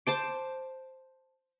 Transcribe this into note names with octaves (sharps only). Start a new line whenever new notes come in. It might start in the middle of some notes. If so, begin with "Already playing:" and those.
C5 A5 D6